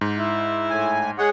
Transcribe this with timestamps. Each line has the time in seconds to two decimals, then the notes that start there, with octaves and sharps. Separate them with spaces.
0.01 G#2
0.17 E4
0.70 A2 G#5
1.18 G#3 G#4 C#5 F#5